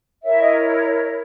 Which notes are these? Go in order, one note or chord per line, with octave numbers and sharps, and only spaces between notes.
E4 A#4 C#5 E5
D#5